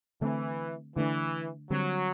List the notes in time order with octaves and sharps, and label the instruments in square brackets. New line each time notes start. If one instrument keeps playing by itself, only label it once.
[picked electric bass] D3 A3 C4 [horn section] E3
[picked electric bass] D3 A3 D4 [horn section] E3
[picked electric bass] D3 G3 C4 [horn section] F#3